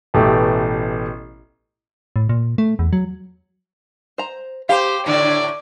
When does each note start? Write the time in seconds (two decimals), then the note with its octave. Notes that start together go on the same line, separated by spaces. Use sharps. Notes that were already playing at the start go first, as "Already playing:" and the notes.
0.14 A1 B2 A3 G4
2.16 A2
2.29 A#2
2.58 A3
2.79 E2
2.93 F#3
4.18 C5 A#5
4.69 G4 C5 F5
5.06 A2 D3 D5